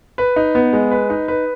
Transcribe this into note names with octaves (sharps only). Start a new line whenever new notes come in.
B4
D#4
B3
G#3
B4
D#4
B4